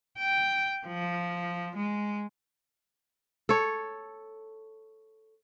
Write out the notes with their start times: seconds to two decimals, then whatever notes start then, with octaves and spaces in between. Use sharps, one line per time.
0.19 G5
0.86 F3
1.75 G#3
3.49 A4 C#5